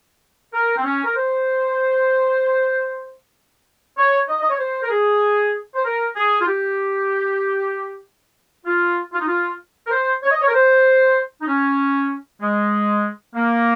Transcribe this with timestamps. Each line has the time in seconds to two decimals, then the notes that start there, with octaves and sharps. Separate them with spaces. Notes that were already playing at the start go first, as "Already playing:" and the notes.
0.53 A#4
0.77 C4
0.84 C#4
1.04 A#4
1.16 C5
3.98 C#5
4.28 D#5
4.41 D#5
4.50 C#5
4.59 C5
4.83 A#4
4.90 G#4
5.75 C5
5.85 A#4
6.16 G#4
6.41 F4
6.47 G4
8.66 F4
9.13 F4
9.20 D#4
9.28 F4
9.87 A#4
9.91 C5
10.23 C#5
10.31 D#5
10.41 C#5
10.47 A#4
10.54 C5
11.41 D#4
11.47 C#4
12.41 G#3
13.35 A#3